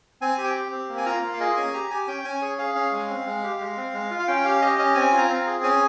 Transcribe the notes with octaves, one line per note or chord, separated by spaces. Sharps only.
C4 G#5
G4
G5
G4
C4
A#3
G#5
F4 A#5
A#3
F5
G#4 D#5
C#4 G#5
G4 A#5
G4 G#5
C#4 G5
C#4 G#5
G#4 C#5
G#4 F5
C#4 F5
G#3
C4
G#3
G4
G#3
C4
G#3
F4
F5
C#4 G5
G4 F5
G4 D#5
C#4 D#5
C4 G#5
F4
A#5
C4
G#4
C#4 G#5